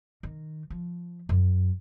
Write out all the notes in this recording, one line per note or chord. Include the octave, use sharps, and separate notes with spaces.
D#3
F3
F#2